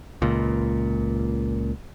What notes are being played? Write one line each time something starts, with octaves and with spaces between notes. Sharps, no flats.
C#2 A#2